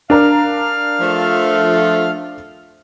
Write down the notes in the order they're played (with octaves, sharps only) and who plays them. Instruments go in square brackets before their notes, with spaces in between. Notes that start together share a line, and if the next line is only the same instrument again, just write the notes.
[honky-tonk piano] D4 A#4 A#5 [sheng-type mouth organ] F5 F6
[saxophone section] F3 A3